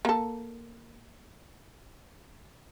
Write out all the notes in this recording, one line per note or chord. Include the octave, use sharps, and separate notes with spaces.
A#3 A4